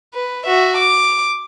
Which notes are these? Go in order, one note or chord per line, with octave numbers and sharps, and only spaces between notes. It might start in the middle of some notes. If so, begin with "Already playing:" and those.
B4
F#4 E5
D6